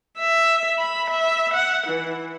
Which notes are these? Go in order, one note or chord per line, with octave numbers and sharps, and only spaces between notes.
E5
B5
E5
F#5
E3